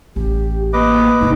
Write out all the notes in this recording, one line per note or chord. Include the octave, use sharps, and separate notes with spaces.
A1 G4
A#3 B4 D#5 D6
G#2 C3 D#4